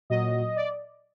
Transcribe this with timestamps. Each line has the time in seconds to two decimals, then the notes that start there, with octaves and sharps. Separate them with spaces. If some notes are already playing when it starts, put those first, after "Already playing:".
0.10 A#2 F#3 D#5
0.56 D5